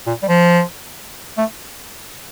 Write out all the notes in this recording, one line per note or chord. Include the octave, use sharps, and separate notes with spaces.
A#2
G3
F3
A3